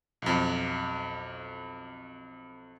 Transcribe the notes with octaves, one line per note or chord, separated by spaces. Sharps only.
B1 F2